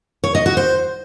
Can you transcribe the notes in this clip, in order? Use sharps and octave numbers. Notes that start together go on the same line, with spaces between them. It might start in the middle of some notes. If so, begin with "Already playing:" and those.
C#5
D#5
F#4
C5